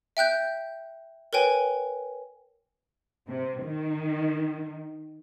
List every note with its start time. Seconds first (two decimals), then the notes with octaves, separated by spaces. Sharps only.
0.17 E5 G5 F#6 G6
1.33 A#4 B4 C#5 G5 G#5
3.28 C3
3.63 D#3